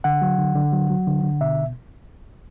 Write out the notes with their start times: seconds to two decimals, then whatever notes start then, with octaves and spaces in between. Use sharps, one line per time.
0.04 D3 F#5
0.22 F#3
0.38 D3
0.55 D3
0.73 F#3
0.90 F#3
1.07 D3
1.24 D3
1.41 B2 E5